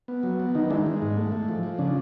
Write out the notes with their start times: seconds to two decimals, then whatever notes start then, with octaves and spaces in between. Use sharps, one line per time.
0.08 B3
0.23 F#3
0.40 B3
0.55 D#3 D#4
0.70 G#3 D4 E4
0.86 G#3
1.02 G#2
1.17 A3
1.32 A3
1.49 F3
1.63 F3
1.79 C#3 D4